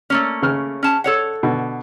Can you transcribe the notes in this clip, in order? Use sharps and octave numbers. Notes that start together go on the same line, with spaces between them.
A3 A#3 C#4
C#3 F6
C#4 A5
A4 C#5 F#5
B2 D3